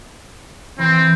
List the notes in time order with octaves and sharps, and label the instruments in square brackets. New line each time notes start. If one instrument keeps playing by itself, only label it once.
[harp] E3 [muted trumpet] C4